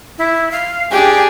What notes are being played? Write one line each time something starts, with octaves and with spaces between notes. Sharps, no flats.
E4
F5
D4 G4 G#4 G5